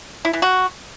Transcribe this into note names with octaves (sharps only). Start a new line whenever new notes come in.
E4
E3
F#4